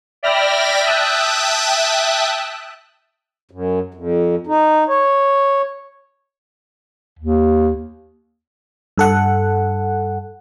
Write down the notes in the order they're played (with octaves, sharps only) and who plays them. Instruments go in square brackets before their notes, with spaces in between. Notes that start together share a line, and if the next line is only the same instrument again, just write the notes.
[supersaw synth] D5 E5 G5 B5 F6 A#6
E5 G5 A5 D#6 E6 F#6
[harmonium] F#2
F2
D#4
C#5
[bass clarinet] D#2
[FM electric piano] G2 A4 F#5